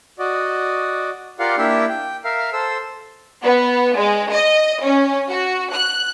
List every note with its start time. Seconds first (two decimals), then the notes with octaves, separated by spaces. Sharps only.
0.19 F#4 D5 D#5
1.39 F4 G4 A#4 D5 F5 F#5
1.58 A#3 D4 E4 G4 E5 G5
1.89 G5
2.24 A#4 E5 F5
2.53 A4 C5 E6
3.42 B3
3.96 G#3
4.32 D#5
4.82 C#4
5.27 F#4
5.72 F#6